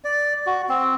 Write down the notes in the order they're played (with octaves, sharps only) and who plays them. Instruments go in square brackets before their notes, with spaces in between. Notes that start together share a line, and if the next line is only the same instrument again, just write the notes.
[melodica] D5
F#4
C4